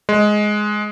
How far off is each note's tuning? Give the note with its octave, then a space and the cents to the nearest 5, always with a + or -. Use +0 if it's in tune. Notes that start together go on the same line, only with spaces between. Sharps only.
G#3 +10